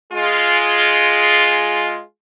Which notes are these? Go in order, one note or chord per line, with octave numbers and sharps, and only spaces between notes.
G#3 F4 G#4